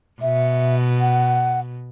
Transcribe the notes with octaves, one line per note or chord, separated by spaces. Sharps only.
B2 E5
F#5